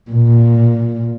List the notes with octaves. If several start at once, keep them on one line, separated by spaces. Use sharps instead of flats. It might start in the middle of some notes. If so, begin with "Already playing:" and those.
A#2